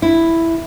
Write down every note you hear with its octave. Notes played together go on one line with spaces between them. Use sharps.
E4